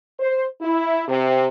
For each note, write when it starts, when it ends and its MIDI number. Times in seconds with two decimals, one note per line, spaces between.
0.19 0.44 72
0.61 1.01 64
1.08 1.47 48